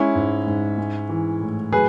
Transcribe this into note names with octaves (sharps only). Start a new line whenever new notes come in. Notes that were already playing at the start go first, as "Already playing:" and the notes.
Already playing: G#3 C#4 E4
G#2
G#2
G#3
E3
A2
F#3 G#4 B4